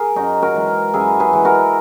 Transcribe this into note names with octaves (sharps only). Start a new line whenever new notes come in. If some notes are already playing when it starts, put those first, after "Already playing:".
Already playing: G#4 A#4
F#2 D#4 F#4
F#4 A#4
E3 G#3
F#2 E4 G#4
G#4 B4
E3 G#3
F#4 A#4